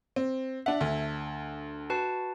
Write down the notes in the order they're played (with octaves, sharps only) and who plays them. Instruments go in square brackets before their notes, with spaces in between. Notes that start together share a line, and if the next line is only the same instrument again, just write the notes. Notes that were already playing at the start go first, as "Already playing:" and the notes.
[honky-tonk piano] C4
[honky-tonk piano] D4 F#5 [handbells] E5
[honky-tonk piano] D2 [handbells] D4
[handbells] F#4 B4 A5